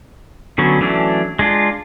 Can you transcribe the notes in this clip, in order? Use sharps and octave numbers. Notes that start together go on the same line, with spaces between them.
D3 F#3 B3 C#4
E3 F#3 A3 C#4 D4
G#3 D4 F4